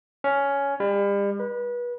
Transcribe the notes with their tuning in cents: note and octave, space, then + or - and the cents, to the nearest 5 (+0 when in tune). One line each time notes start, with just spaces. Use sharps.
C#4 +10
G3 +40
B4 -30